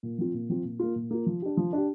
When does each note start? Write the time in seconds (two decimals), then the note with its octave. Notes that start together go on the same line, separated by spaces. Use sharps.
0.03 A#2
0.18 F3 C4 F4
0.34 A#2
0.49 F3 C4 F4
0.65 A#2
0.79 A#3 F4
0.95 A#2
1.11 A#3 F4
1.26 F3
1.42 D4 G4
1.57 F3
1.73 D4 G4